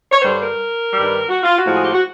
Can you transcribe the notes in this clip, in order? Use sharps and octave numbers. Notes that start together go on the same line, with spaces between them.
C#5
G2 D3 G3 C5
A#4
G2 D#3 G3
F#4
F4
F#4
A2 F3 G#3
G#4
G4
F#4